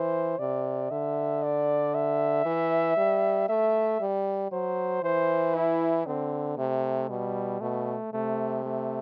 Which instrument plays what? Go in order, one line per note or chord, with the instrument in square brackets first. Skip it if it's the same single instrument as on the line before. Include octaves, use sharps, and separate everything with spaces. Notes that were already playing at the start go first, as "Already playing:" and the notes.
Already playing: [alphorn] E3 [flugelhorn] C5
[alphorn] C3 [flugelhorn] D5
[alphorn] D3 [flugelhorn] E5
[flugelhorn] D5
E5
[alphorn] E3
G3
[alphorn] A3 [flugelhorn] E5
[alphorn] G3
[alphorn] F#3 [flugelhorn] C5
[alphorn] E3 [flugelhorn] C5
[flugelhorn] E4
[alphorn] D3 [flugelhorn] C4
[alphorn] C3 [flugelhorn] A3
[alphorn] B2 [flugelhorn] G3
[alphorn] B2 [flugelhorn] A3
[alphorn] C3 [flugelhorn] A3
[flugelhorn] A3